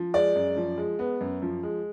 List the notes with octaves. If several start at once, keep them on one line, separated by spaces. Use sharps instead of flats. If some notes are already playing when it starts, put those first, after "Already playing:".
Already playing: F3
G#3 D5
F#2
F3
G#3
B3
F#2
F3
G#3